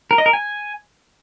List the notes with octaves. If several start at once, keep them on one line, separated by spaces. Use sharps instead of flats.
A#4
D#5
A#4
G#5